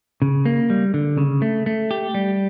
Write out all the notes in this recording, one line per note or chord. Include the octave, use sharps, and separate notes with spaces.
C#3
A#3
G3
D3
C#3
A3
A3
G4
G3